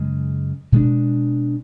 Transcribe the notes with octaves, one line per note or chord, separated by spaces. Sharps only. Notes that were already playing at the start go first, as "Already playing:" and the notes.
Already playing: F#2 C#3 G#3
B2 G#3 D4